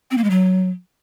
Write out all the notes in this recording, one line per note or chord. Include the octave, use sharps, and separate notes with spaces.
C4
A#3
G#3
F#3